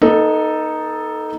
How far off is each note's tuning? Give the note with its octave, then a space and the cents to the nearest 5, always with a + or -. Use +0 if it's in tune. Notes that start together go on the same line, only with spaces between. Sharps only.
B3 -35 D#4 +0 A4 +0